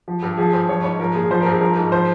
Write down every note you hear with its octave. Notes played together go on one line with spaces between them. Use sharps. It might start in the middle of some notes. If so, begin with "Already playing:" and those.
F3
G2
F3 G#4
G2 C5
F3 C#5
G#2 C#5
F3 A#4
A#2 G#4
F3 C5
A#4
G2
G#4
F3 A#4
G#2
F3 C5